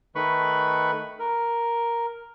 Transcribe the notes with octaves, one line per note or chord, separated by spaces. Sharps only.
D#3 A3 B4 B5 C#6
A#4